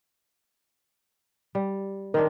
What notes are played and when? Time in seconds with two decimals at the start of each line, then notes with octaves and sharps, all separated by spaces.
1.55 G3
2.14 D#3 C4 D4 A#4